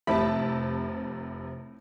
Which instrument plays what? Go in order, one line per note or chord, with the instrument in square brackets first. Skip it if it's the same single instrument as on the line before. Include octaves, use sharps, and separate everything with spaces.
[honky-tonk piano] F1 C3 A5 [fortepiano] A2 E4 B5